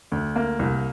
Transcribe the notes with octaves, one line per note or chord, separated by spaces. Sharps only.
D2
A#3
C2